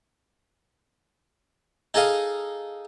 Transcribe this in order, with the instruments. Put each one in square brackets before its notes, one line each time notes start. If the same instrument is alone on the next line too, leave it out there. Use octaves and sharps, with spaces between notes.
[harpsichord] D#4 G#4 A4 D#5 F5